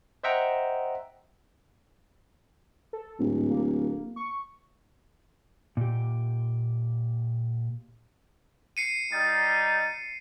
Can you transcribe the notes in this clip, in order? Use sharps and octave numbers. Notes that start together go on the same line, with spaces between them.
C5 D#5 E5 F#5 G5 A#5
A4
D1 G#2
A#3
C#6
A#2 G4
C7 C#7 D#7
G3 D#4 A6